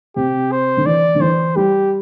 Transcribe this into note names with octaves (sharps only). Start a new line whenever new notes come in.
C3 G4
C5
D3
E3 D5
D3
E3 C5
G3 G4